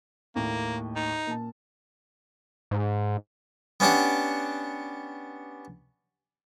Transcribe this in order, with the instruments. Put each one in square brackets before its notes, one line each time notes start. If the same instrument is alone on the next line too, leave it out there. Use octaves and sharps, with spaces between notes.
[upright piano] D#2 A2 [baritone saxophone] A#3
[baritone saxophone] D#4
[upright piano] A#2 A5
[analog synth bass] G#2
[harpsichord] B3 C#4 D4 G4 F#5